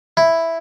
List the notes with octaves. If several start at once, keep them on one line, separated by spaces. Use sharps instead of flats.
E4